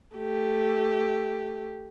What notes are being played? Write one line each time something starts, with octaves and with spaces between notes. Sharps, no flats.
A3 G4